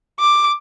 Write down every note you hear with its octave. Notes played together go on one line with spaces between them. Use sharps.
D6